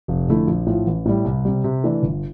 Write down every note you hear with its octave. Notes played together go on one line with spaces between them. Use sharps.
F1
F2 D3 A3 E4
A#1
A2 F3
A1
A2 G3
C2
C3 G3
C3
E3 A3 D4
G1